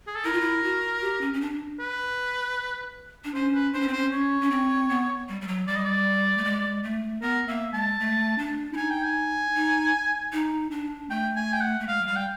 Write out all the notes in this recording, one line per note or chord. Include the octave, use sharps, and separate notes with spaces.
G#4
A4
E4 A#4
F4
E4
F#4
G4
C#4
C#4
D4
B4
D4
C#4 C5
B4
D4 C5
C#4
C4
C#4 C5
C#4 C#5
C#4
C4
B3
G3
G3
F#3
G3 D5
D#5
D5
A3
G#3
A3
B3 A#4
A#3 E5
G#3 A5
A3
D4
E4
D#4 G#5
G5
G#5
D#4
D#4
D4
A3 G5
G#5
G5
F#5
A3
G#3 F5
F#3
G3 F5
G5